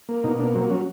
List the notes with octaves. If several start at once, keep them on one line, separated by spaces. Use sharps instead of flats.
A#3
B2 D#4
A#3 D4
F#3 C4
F#3 C#4